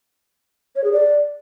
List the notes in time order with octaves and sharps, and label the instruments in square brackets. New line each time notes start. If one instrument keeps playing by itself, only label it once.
[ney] C#5
G#4
D5